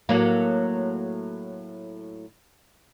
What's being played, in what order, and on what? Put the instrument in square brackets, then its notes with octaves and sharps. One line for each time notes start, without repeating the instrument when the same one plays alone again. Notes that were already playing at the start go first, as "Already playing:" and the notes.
[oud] A2 F#3 A#3